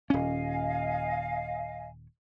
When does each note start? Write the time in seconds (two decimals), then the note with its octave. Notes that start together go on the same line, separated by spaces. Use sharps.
0.10 D#1 C#4 D#5 F5 G#5